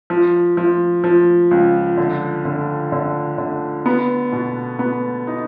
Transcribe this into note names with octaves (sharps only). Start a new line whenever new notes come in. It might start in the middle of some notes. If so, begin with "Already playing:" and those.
F3
F3
F3
C#2
D3
D3
D3
D3
B3
B2
B3
D#4